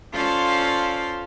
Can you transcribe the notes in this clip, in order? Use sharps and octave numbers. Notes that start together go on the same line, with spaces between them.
C#4 F4 A4 C5 D5 F5